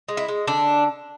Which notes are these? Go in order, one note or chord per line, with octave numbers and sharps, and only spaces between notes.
G#3
E4
G#3
D3 D4